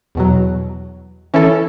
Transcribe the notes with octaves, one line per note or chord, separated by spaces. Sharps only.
E2 B2 F#3
E3 C#4 E4 A4